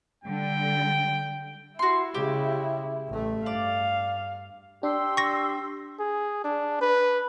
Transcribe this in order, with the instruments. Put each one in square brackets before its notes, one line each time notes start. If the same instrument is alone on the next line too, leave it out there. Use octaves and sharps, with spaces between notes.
[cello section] D3 G3 [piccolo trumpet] G5
[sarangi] E4 [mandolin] F#4 C6
[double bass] C#3 G#3 [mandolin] G4
[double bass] A1 A3
[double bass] G2 [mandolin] D5 [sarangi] F5
[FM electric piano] D4 [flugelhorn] G4 [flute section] C6 E6
[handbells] C#6 A#6
[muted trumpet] G#4
D4
B4